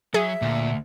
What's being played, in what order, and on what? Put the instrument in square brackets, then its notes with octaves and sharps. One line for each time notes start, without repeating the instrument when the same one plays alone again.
[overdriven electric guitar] F#3 [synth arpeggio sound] G#4 [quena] E5
[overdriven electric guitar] D2 [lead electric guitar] A#2